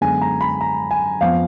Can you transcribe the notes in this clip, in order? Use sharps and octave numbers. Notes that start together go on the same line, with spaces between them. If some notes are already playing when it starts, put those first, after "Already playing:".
F#2 D3 G#3 B3 G#5
A#5
B5
A#5
G#5
F2 F3 B3 F5